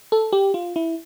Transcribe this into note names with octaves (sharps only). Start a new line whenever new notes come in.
A4
G4
F4
E4